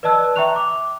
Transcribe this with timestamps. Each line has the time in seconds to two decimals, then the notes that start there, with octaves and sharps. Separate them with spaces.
0.03 B4 D5 D#5 A5 E6 F#6
0.36 E5 G5 A#5 C#6 F#6 F7
0.56 D6